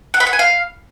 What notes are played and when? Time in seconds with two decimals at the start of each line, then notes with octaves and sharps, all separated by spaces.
0.14 F#5
0.20 B5
0.27 F#5
0.33 G#5
0.39 F5